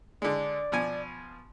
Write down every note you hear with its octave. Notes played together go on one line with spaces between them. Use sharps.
D3 G#3 D5
B2 F3 G#5